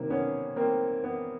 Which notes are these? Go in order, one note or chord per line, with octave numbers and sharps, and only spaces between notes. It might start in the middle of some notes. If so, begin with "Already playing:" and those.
Already playing: C3 D#3 F#3 A#3 C4
B3 C#4
A#3 C4
B3